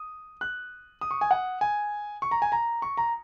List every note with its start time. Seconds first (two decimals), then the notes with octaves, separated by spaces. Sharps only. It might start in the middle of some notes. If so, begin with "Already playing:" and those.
Already playing: D#6
0.41 F#6
1.01 D#6
1.11 C#6
1.21 G#5
1.31 F#5
1.61 G#5
2.22 C#6
2.31 A#5
2.42 G#5
2.52 A#5
2.82 C#6
2.97 A#5